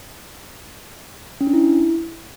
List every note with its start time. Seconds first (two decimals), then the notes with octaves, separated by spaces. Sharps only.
1.41 C#4
1.47 D4
1.53 E4